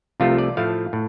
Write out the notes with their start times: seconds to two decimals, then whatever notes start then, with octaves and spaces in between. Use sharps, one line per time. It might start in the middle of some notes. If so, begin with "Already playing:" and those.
0.20 C2 C3 F3 A3 F4
0.38 D5
0.57 A2 F3 A3 F5
0.93 A2